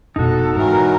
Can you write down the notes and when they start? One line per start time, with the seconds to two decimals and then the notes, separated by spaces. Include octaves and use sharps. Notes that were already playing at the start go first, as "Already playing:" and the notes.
0.16 F1 B2 D#4 F#4 A4
0.56 G#2 D#3 E3 F#3 A#4